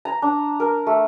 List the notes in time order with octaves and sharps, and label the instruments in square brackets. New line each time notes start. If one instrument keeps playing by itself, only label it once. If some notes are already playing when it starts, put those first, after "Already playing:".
[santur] A#5
D4
A#4
A3